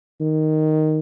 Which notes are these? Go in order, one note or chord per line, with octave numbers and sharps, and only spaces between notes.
D#3